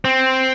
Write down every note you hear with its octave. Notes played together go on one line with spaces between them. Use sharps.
C4